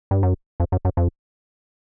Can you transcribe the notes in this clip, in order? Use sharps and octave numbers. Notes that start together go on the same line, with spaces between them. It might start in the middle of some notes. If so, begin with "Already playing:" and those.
G2
F#2
F2
F#2
F#2
F2